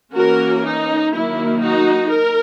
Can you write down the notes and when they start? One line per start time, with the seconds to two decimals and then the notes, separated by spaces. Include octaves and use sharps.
0.14 E3 A#3 C#4 F#4 A#4
0.65 D#4
1.14 D#3 F#3 A#3 E4
1.62 D#4 F#4
2.12 A#4